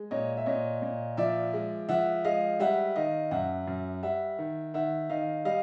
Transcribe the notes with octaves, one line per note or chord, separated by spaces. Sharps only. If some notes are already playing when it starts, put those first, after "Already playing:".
Already playing: G#3
A#2 C#5 D#5
E5
A#2 C#5 D#5
A#2
F3 D5 E5
G#3
F3 E5 F#5
G#3 D#5 F5
G3 E5 F#5
D#3 D#5 F5
F#2 E5 F#5
F#2
G3 E5 F#5
D#3
D#3 E5 F#5
D#3 D#5 F5
G3 D#5 F5